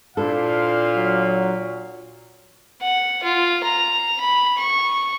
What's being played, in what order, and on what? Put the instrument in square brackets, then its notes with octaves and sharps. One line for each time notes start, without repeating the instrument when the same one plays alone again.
[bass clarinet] A#2 [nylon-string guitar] D4 E4 A4 [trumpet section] C5 D5 F5
[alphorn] F#3
[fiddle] F#5
F4
A#5
B5
C#6